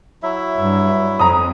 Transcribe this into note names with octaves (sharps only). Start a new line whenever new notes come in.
F#3 E4 E5
G2
F2 A#5 D#6